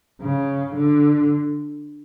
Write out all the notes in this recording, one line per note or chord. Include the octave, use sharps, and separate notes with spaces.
C#3
D3